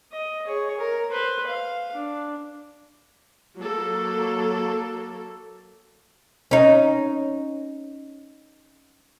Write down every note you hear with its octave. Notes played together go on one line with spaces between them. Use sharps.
D#5
G#4 C#5
A#4
B4 C5
F5
D4
F#3 A#3 A4
C#4 D#4